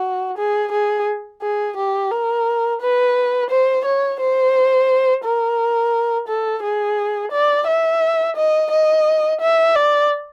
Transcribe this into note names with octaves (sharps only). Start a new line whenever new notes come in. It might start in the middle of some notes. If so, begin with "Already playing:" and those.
Already playing: F#4
G#4
G#4
G#4
G4
A#4
B4
C5
C#5
C5
A#4
A4
G#4
D5
E5
D#5
D#5
E5
D5